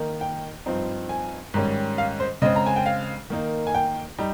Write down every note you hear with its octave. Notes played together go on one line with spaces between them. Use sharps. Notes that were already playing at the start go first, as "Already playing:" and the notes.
Already playing: D#3 A#3 D#4
G5
G2 F3 C4 D#4
G#5
G#2 D#3 G3 C#4
F5
C5
C#3 G#3 C4 D#5
A#5
G#5
G5
F5
D#3 A#3 D#4
G#5
G5
G3 D#4